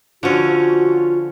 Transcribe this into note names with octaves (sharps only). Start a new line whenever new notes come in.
D3 F3 C#4 F4 F#4